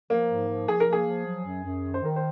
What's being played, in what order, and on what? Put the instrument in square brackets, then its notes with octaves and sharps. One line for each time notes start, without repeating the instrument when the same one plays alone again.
[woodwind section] F3 [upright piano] A#3
[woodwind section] G#2
F3
[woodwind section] F3 [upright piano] G#4
[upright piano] A#4
[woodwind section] A#3 [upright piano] G#4
[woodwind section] F3
F#3
F#2
F#2
D#3
[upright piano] C5
[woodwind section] D#3 [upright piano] A#4
[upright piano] C5